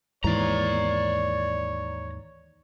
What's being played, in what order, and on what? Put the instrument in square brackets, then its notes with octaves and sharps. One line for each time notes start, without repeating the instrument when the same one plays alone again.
[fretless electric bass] D#2 G#2 E3 [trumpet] C#5 [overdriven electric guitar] D5 A#5